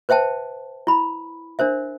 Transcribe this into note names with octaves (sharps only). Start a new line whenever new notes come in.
B4 C5 E5 G5 A5
E4 B5
D4 A#4 C5 E5